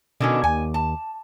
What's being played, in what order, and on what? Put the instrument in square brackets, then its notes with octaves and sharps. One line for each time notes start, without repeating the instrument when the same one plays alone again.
[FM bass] B2 [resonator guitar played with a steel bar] D3 D#3 C#4
[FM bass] D#2 [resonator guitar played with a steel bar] G#5
[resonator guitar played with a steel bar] A5